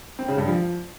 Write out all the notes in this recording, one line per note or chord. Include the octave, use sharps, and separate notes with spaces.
C4
C#3
G2
F3